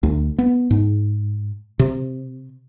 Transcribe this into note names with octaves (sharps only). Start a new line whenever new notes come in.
D2
B3
G#2
C3